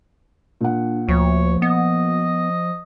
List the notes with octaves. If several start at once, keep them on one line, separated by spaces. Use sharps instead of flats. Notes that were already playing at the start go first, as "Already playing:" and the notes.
A#2 D4 F#5
D2 F3 C#5
B3 D#5